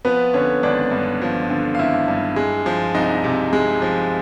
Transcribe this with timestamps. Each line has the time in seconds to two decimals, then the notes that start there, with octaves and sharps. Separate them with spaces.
0.05 F3 B3 B4
0.34 D3 C#4 C#5
0.63 G#1 D4 D5
0.92 G2
1.22 F3
1.50 D3
1.75 F5
1.79 G#1 E4 E5
2.08 G2
2.36 G#3
2.66 F3
2.94 C2 D#4 D#5
3.24 C3
3.53 G#3
3.82 F3